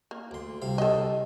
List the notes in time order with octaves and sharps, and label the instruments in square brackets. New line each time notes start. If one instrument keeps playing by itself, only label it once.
[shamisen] A#3
[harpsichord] D2 C6
C2 C3 F5
[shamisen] A4 D#5